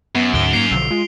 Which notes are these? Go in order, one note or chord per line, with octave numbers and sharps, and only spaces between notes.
F#2 B3
D2 G#2 D7 G7
A#3 C7 F7
B1 D3 F3 E6
G#3 F4